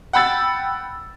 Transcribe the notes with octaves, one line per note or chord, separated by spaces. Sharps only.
F#5 G5 B5 E6 A6